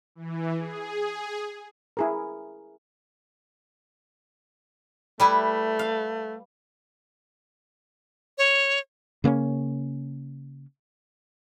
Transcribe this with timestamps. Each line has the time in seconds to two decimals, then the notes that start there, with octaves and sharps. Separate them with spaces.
0.15 E3
0.56 G#4
1.97 E4 G#4 A#4
5.20 G3 A3 E4 B4
5.79 F5
8.38 C#5
9.24 C#3 A#3 B3 C#4